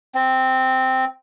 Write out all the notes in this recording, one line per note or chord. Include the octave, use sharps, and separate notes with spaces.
C4